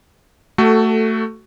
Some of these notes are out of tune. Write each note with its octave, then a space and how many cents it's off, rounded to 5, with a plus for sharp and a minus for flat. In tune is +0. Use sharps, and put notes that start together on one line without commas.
A3 +15 F#4 +20 A4 +0